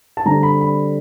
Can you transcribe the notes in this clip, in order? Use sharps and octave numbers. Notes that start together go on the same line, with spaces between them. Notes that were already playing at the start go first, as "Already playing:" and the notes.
A5
D3 G3 C4 A#5
B5
B5